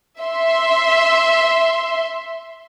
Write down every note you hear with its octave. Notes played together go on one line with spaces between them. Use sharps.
E5 C6